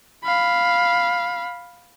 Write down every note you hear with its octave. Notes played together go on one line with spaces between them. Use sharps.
F5 B5